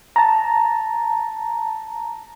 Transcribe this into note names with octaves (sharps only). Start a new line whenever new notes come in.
A5 A#5